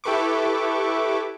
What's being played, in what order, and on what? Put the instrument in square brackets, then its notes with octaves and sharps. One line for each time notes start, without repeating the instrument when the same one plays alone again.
[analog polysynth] E4 G4 A4 B4 C#6 D6